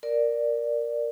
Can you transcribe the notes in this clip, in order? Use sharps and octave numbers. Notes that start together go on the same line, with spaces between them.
A#4 D5